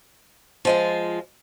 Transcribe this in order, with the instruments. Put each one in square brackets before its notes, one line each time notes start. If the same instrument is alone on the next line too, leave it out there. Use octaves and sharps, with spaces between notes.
[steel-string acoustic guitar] F3 G#3 F4